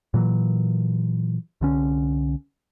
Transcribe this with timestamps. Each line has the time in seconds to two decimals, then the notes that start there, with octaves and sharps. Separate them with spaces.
0.14 A#2 E3 F#3
1.61 C2 D3 C#4